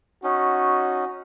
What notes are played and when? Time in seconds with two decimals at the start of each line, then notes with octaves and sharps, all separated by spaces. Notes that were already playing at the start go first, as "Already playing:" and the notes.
0.24 C#4 D#4 F#4